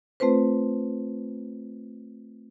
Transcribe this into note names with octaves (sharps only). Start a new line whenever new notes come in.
A3 C4 F4 B4 C5